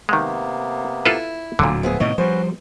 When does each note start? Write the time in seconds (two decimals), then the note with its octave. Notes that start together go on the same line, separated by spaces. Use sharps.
0.09 C3 D#3 G#3 A#3 B3
1.05 E4 F4 A4 B4
1.59 D1 D2 A#2 D3 F#3
1.83 F3 B3 G#4 E5
2.00 A2 C3 D#3 C#5 D#5
2.18 F3 G3 C#4 F#4 B4 C5